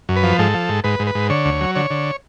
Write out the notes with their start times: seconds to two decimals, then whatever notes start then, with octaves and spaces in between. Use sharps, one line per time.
0.09 F#2
0.16 B4
0.23 F3
0.39 G#2 A4
0.54 F3
0.69 G#2
0.84 G#2 B4
0.99 G#2
1.07 B4
1.15 G#2
1.30 D3 C#5
1.45 D2
1.61 F#3
1.75 D3 C#5
1.90 D3